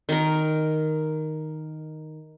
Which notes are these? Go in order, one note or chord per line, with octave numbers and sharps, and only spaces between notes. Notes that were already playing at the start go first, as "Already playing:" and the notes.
D#3 A#4